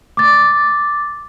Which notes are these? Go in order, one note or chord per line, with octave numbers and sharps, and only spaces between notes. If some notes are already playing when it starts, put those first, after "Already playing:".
D6 A6